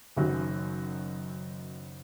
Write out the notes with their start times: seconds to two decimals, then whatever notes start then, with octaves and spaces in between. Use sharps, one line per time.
0.16 F#1 F#2 D#3 F#3